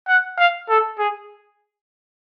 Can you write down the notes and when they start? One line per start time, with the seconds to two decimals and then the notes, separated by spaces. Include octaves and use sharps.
0.08 F#5
0.38 F5
0.69 A4
0.99 G#4